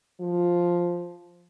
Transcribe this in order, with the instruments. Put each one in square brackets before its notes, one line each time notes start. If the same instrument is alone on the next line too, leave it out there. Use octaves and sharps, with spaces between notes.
[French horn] F3